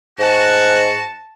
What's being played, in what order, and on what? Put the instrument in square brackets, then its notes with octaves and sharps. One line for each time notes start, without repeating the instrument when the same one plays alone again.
[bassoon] G#2 [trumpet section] F#4 [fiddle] A5